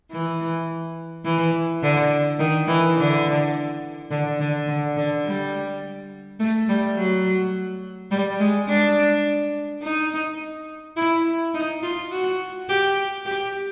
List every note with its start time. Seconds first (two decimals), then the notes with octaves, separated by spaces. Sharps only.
0.11 E3
1.24 E3
1.82 D3
2.39 D#3
2.68 E3
2.97 D3
4.10 D3
4.40 D3
4.68 D3
4.97 D3
5.25 G3
6.39 A3
6.68 G3
6.97 F#3
8.11 G3
8.40 G#3
8.69 D4
9.83 D#4
10.96 E4
11.54 D#4
11.83 F4
12.11 F#4
12.69 G4
13.25 G4